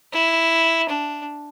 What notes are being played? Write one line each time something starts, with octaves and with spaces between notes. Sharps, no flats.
E4
D4